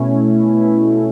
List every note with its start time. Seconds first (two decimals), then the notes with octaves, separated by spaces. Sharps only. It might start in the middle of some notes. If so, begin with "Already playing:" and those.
Already playing: B2 A3 C#4 E4
0.52 B2 A3 C#4 E4